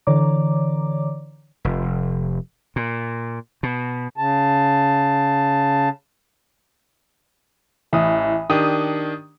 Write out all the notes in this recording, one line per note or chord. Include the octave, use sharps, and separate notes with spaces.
D3 E3 C#5 D5 A#5 D6
F1
A#2
B2
C#3 A5
A1 E3 D#6
D#3 D4 G4 D#6